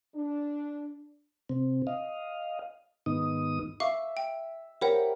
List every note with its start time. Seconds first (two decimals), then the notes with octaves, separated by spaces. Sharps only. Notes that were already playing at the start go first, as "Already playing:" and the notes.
0.15 D4
1.49 C3 C4
1.87 D#5 F5
3.06 G#2 D#3 B3 D#4 D#6
3.80 E5 F5 C#6 D6
4.17 G5
4.81 G4 A#4 C5 C#5 F#5 B5